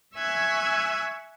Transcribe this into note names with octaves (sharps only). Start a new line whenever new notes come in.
E5 G#5 C#6 E6 F#6 G#6